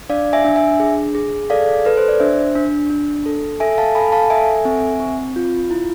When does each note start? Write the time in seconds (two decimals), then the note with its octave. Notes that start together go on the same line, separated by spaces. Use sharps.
0.09 D4 D5 F5
0.33 E5 G#5
0.44 D4
0.56 E5 G#5
0.80 G#4
1.15 G#4
1.50 A4 D5 F5
1.85 A4 B4
1.97 C5
2.08 D5
2.20 D4 C5 E5
2.55 D4
2.90 D4
3.26 A4
3.60 A4 E5 G#5
3.78 F5 A5
3.95 A4 G#5 B5
4.12 F5 A5
4.30 A4 E5 G#5
4.65 C4
5.00 C4
5.36 F4
5.71 E4